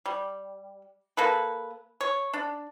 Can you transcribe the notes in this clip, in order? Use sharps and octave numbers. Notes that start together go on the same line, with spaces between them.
G3
A#3 A4 B4
C#5
D4